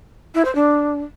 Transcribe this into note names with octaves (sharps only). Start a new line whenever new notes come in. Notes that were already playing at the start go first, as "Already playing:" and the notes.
E4
C5
D4